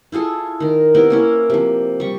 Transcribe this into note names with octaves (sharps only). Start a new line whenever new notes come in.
E4 F4 G#4 A4
D#3 A#4
C3 B3 E4 A#4
A#3 C#4 E4
C3 F3
G3 C#6